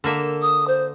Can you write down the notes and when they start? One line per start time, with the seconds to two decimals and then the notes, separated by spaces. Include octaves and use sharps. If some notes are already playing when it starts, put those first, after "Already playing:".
0.04 D3 A#3 E5
0.42 D#6
0.68 C5